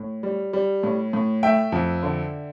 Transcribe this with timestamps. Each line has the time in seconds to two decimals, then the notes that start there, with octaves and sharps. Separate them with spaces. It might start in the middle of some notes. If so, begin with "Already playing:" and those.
Already playing: A2
0.23 G3
0.53 G3
0.83 A2
1.13 A2
1.43 A3 E5 G5
1.72 F2
2.03 D3